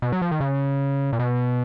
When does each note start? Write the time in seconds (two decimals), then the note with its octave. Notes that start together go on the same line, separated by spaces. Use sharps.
0.02 B2
0.12 F#3
0.22 F3
0.31 D#3
0.40 C#3
1.13 A#2
1.19 B2